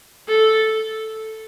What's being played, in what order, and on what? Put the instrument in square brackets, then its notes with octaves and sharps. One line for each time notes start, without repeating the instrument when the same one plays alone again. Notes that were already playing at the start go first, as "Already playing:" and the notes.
[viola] A4